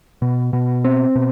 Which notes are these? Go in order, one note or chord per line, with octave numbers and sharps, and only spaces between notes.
B2
B2
C4
B2